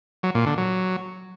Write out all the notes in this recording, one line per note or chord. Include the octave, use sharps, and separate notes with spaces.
F#3
A#2
D3
F#3